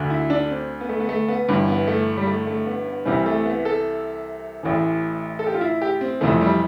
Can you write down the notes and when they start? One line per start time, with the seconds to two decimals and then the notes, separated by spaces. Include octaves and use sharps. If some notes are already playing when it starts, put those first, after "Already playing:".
Already playing: D2 D3
0.10 E4
0.30 D4
0.50 C4
0.81 B3
0.89 A3
1.00 B3
1.09 A3
1.28 B3
1.48 G1 G2 E3
1.68 B3
1.87 A3
2.17 G3
2.27 A3
2.47 A3
2.66 B3
2.86 B3
3.05 C2 C3 E3 G3
3.26 A3
3.45 B3
3.65 A4
4.63 A1 A2 E3
5.39 A4
5.47 G4
5.54 F4
5.61 E4
5.82 G4
6.01 C4
6.21 F1 F2 C3 E3 A3
6.41 G3